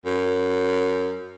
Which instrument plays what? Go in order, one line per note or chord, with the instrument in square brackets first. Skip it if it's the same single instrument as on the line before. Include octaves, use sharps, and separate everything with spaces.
[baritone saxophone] F#2